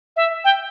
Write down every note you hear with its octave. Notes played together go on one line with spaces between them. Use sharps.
E5
G5